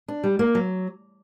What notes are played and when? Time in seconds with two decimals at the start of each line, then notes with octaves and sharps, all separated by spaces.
0.08 D4
0.24 G3
0.39 A#3
0.55 F#3